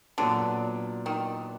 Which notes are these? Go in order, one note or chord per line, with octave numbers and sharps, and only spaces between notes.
A#2 D3 F#3 B3 D4
D#3